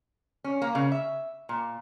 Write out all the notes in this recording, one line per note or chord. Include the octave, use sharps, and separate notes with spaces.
C#4
A#3
C#3
E5
A#2